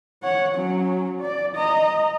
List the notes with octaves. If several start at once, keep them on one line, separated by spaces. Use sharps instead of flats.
C#5 F#5
F#3 C#4
D5
D#5 A#5